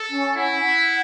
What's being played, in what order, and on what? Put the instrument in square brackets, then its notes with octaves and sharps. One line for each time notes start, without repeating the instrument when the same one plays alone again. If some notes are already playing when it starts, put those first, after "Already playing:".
Already playing: [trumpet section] A4
[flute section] C#4
[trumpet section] E4 [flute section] F#5
[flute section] F#5